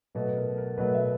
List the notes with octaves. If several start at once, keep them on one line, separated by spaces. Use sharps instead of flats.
B2 F#3 A3 B4
A#4
A#4
B2 F#3 A3 B4
E5